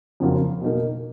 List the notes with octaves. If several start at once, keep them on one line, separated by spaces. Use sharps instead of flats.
F2 C#3 F#3 A#3 F4
B2 A#3 D#4 A#4